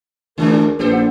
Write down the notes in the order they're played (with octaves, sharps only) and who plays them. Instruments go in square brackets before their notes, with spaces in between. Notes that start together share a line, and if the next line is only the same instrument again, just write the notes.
[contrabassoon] D2 [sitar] D#3 G#3 D4 [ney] A#4
[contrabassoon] A#1 [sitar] G4 A4 C5 [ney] B4
[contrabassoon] A#1 [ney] F#5